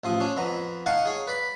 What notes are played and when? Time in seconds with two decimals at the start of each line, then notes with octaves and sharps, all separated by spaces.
0.04 A1 F3 D#6
0.20 C#4 D4
0.37 F2 B3 A#5
0.86 D#4 F5 F#5 G#5 A5 C#6
1.06 G#4 C#5
1.27 B4 D5 B5